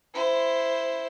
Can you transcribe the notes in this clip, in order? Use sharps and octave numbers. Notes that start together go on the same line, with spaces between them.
E4 C5